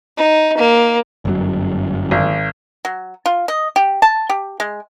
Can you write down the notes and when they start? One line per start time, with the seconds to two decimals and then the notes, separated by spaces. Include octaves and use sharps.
0.18 D#4
0.58 A#3
1.25 G1 F#2 F#3
2.11 G#1
2.85 F#3
3.26 F4
3.48 D#5
3.76 G4
4.02 A5
4.29 G4
4.60 G#3